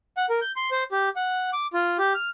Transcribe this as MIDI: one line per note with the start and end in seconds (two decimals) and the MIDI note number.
0.17 0.26 78
0.29 0.40 70
0.41 0.52 91
0.56 0.70 84
0.71 0.84 72
0.92 1.09 67
1.16 1.50 78
1.53 1.67 86
1.73 1.97 65
1.98 2.13 67
2.15 2.29 89